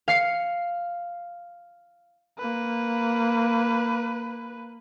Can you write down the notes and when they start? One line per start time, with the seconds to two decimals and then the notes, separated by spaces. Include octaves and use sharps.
0.08 F5 C7 C#7
2.38 A#3 B4